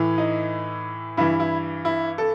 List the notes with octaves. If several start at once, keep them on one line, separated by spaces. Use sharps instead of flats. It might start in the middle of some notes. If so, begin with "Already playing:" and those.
Already playing: A2 E3
D#4
G2 E3 E4
E4
E4
A4